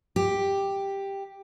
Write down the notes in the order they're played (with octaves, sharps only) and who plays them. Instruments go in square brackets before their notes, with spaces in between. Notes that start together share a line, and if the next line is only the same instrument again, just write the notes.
[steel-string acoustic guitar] G4